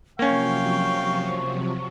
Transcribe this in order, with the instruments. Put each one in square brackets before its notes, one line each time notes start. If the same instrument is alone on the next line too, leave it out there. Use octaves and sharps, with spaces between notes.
[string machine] C3 F3 F#3 [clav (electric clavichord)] A#3 C#4 [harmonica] F5 G5 [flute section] C#6